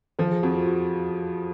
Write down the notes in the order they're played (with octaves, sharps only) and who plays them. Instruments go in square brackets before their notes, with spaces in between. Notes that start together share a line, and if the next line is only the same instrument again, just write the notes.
[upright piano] F3 [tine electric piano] A4
[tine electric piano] G#4
[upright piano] F2 [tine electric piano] F#4
[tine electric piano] F4
F#4